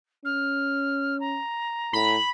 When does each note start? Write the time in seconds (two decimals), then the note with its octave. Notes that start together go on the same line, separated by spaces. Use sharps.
0.25 C#4 F6
1.20 A#5
1.93 A2 B5